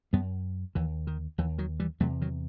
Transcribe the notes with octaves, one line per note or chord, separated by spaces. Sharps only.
F#2 G3 B3
D#2 E3
D#3
D#2 E3
D#3 F#3
E3 G3
E2 C3 F#3 A3
D#3 F#3